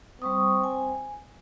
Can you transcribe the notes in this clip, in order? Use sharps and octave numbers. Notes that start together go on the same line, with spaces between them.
G3 C4 C#6 D#6
G#5